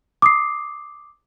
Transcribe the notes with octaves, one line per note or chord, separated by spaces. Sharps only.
D6 D#6 C7